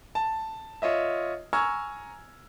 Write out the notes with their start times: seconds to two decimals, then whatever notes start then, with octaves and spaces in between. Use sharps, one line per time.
0.15 A5
0.82 F4 C#5 D#5 E5
1.53 G#5 A#5 C#6 E6 F6 G#6